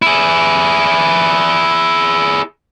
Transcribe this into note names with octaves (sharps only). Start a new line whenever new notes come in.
E4 G#4